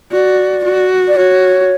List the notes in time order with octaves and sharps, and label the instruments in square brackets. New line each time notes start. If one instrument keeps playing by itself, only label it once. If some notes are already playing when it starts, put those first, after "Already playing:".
[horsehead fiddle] F#4 [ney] D5
[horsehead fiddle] F#4
[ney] D5
[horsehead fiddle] F#4 [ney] C#5